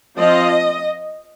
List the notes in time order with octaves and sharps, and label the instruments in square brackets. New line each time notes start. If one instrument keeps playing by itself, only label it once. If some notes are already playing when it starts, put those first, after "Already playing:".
[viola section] F3 C4 F4 D#5